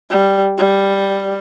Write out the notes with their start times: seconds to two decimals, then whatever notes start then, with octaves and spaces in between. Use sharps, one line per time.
0.11 G3
0.58 G3